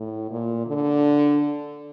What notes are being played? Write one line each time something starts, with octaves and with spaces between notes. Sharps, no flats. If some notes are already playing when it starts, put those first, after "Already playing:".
Already playing: A2
A#2
D3